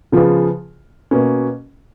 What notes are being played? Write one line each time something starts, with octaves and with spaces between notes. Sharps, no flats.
C#3 F3 B3 F4 G#4
B2 A#3 C#4